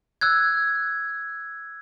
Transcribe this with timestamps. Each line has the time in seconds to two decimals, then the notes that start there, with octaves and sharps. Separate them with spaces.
0.21 E6 F#6 G#6